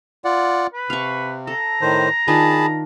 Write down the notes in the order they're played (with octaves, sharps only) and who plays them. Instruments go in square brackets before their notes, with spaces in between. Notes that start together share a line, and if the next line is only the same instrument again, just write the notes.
[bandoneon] F4 D5 F#5
[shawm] B4
[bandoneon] C3 [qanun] F5 C#6
[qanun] A4 [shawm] A#5
[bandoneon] A2 D#3 C5
[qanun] D#3 D4 F4 [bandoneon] G#4 A5 B5